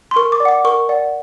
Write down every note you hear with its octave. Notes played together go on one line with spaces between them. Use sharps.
C6
A#4 C#6
D6
D5
F#5 D6
A#4 C#6
D5 F#5